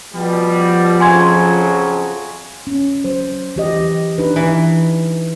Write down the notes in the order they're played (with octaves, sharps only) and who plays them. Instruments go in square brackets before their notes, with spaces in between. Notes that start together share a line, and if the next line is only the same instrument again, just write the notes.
[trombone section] B2 G3 [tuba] F3
[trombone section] F2 C#3 F#3 [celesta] G#5 C6 G#6
[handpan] C#4
F#3 C5
E3 G4 D#5
D4 D#4 B4
[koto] E3